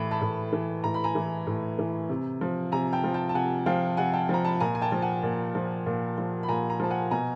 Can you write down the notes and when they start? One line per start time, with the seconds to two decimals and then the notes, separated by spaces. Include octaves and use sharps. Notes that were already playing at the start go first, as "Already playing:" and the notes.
Already playing: A2 E3 B5
0.11 A5 B5
0.22 A2
0.53 E3
0.84 A2 A#5
0.94 B5
1.04 G#5 A#5
1.15 E3
1.47 A2
1.79 E3
2.09 C3
2.41 F3
2.72 C3 G#5 A#5
2.93 G5 A5
3.04 F3
3.14 G5 A5
3.29 A5
3.34 C3 F#5 G#5
3.66 F3 F5 G5
3.97 C3 F#5 G#5
4.13 G5 A5
4.29 F3 A#5
4.45 A5 B5
4.60 A#2 G#5 A#5
4.75 G#5
4.81 G5 A5
4.92 F3
5.02 F#5 G#5
5.23 A#2
5.55 F3
5.86 A#2
6.18 F3
6.43 B5
6.49 A#2 G#5 A#5
6.70 G#5 A#5
6.80 F3 A5
6.91 F#5 G#5
7.11 B2 G#5 A#5